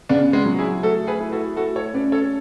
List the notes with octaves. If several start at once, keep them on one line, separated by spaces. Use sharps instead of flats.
C#3 B3 D4
G#3 B3
F#3
E4 G#4
A3 F#4 A4
G#4 B4
E4
F#4 A4
A3 F#4 A4
A4 C#5
C#4 B4 D5
A4 C#5